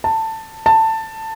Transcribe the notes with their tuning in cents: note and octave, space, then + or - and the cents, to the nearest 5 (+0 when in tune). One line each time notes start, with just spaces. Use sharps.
A5 +15
A5 +15